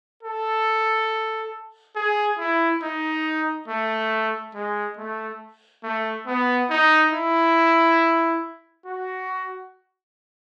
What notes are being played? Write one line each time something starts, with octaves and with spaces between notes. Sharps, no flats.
A4
G#4
E4
D#4
A3
G#3
A3
A3
B3
D#4
E4
F#4